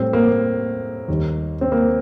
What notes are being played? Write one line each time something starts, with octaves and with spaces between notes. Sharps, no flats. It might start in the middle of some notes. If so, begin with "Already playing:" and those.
Already playing: A2 G3 C4
A#3
D#2 D#3 G3
C4
A#3